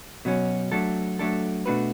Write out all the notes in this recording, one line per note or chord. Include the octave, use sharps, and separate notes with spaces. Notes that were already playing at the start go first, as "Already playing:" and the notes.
B2 F#3 C#4
F#3 A3 D4 A4
F#3 A3 D4 A4
B2 A3 D4 F#4 B4